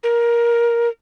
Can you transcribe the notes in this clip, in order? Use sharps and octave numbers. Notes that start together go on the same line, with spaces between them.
A#4